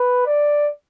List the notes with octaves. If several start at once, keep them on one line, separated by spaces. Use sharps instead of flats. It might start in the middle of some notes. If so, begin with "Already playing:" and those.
Already playing: B4
D5